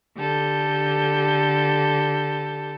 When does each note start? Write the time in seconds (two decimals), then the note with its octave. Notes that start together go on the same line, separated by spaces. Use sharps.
0.16 D3 G4 A4 G6